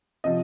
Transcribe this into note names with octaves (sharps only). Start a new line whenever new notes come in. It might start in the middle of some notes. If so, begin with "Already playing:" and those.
C3 F3 D#5